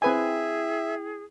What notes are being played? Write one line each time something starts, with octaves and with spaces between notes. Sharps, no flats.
C4 E4 G#4 B4 E5 G5 G#5